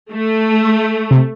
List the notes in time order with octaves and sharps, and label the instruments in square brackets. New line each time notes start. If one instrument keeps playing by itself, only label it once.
[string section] A3
[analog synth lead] C3